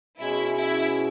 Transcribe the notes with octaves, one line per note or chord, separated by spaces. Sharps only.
B2 G#3 C#4 E4
E4